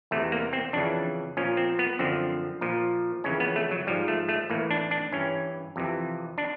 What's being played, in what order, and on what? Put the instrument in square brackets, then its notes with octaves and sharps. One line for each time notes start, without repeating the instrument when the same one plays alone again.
[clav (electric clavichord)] E2 C3 E3 A3
A#3
C4
F2 C#3 E3 D4
A#2 F3 C#4
C4
B3
F#2 D3 F3 C4
A#2 F3
F2 C#3 E3 C#4
B3
A3
F#3
G#2 F3 G3
A3
A3
A2 E3 A#3
D4
D4
G2 E3 C#4
F2 C3 E3
D4